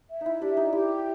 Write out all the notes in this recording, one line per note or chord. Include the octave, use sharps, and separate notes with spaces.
E5
D#4 E4
D4 G4
D#4
E4 G4